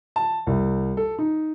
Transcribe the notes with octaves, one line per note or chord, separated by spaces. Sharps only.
A5
C2
A4
D#4